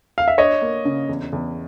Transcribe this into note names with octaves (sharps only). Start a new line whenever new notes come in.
F5
E5
D4 C#5 D#5
A#3
C#3
E2
E2